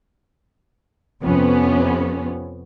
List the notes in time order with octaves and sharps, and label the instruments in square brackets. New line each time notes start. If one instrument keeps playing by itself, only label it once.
[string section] F2 C3 B3 C#4